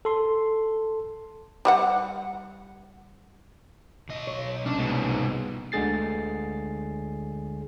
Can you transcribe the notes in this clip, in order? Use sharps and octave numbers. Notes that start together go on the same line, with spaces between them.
A4 C6
G3 G#4 F#5
B1 D#5
C#5
C2 C#4 D4
G#2 B2
D2 D3 G#3 G#4 A6 C7